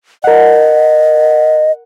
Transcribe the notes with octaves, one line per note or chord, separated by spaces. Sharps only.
A#4 D#5 F#5